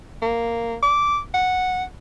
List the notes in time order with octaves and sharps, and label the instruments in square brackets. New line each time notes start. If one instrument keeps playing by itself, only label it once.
[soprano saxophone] A#3
D6
F#5